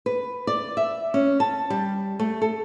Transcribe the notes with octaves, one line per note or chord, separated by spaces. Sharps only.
B4
D5
E5
C#4
A5
G3
A3
A4